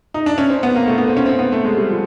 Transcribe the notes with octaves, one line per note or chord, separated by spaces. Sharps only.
D#4
D4
C#4
C4
B3
A#3
A3
B3
C4
C#4
C4
B3
A3
G#3
G3
F3